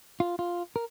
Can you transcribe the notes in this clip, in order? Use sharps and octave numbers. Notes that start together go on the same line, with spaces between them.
F4
F4
A#4